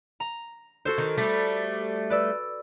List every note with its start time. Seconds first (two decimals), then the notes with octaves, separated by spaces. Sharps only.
0.20 A#5
0.85 F#4 A4 C5
0.98 D#3
1.18 G3 A3 D4
2.10 B4 D5 E6